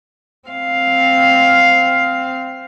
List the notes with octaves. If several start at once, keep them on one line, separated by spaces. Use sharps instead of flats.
C4 F5